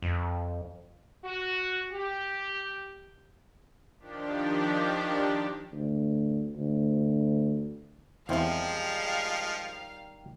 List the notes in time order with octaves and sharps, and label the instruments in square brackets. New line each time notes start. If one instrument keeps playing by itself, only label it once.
[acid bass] F2
[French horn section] F#4
G4
[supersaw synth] D#3 F3 D4 G4
[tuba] D2
D2
[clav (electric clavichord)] E2 C4 E4 [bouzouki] D#3 G3 [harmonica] F3 G#3 [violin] F5